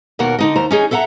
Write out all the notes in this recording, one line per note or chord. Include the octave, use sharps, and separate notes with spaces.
D#2 B2 A#3 A#4 F#5
D3 D#4 D#5
D#2 C5 A#5
C#4 D#4 G#4
A4 E5 F#5 G#5 A#5